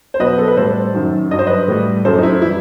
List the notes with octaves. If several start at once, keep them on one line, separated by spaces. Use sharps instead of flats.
C5
B2 F#3 B4 D#5
A4
B4
A2 G3 A4 C5
F#2 D#3 F#3
G2 F#3 D#5
C5
B4 D#5
A2 G3
F#2 F#3 A4 C5
D#4
E4
E3 G3 E4